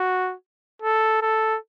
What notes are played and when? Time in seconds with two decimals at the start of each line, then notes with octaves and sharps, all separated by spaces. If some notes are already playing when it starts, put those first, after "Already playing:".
Already playing: F#4
0.82 A4
1.22 A4